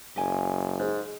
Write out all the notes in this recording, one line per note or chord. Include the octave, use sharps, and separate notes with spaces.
F#1 G4 G#5
G#2